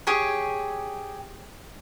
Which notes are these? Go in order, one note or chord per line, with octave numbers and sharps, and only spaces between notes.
G4 G#4 C#5